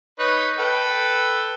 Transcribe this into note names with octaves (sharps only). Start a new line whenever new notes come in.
D#4 B4 C#5
A4 B4 G5